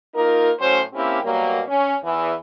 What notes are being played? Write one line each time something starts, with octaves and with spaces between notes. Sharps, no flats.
A#3 D#4 F4 A#4
A2 F#3 C#4 C5
A#3 C4 C#4 E4 G4
B2 F#3 G3 A#3
C#4
E2 E3